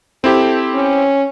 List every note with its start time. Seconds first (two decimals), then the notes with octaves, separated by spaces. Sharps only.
0.24 C4 E4 G4 A4
0.75 C#4